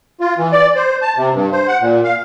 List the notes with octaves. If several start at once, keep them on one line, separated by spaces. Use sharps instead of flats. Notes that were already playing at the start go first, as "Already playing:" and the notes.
F4
E3
D5
C5
A5
C3
G2
C5
F#5
A#2
F5